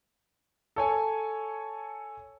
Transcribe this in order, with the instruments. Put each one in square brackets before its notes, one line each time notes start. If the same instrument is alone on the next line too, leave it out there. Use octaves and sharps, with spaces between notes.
[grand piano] A4 C#5 G#5